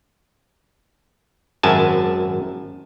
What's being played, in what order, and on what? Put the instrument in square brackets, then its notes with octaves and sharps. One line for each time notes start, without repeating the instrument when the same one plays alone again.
[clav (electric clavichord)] G#1 F#2 G#5 A5